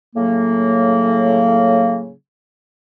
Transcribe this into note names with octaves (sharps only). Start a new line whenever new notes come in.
A2 C#3 F#3 A#3